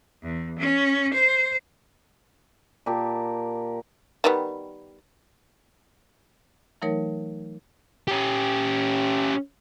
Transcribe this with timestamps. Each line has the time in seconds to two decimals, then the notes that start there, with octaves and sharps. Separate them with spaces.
0.23 E2
0.59 C#4
1.14 C5
2.86 A#2 G4 A#4 A5
4.24 D#3 G3 B3
6.82 E3 F#3 A3 D#4 A#4 C#5
8.07 C#4 G4